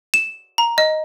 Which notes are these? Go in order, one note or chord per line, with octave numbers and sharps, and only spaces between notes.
E7
A#5
D#5